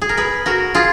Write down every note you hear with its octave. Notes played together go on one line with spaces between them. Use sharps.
G#4
A#4
G#4 B4
F#4 A#4
F4 G#4